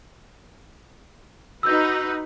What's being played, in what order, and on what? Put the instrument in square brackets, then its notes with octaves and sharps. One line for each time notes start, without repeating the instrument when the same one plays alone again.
[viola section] D#4 F#4 B4 [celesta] E6 G6